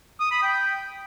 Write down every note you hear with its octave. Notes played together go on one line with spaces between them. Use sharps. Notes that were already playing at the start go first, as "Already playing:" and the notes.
D#6
B5
G5